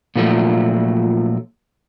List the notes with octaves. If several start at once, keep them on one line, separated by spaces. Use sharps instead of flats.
A#2 F3 F#3 A3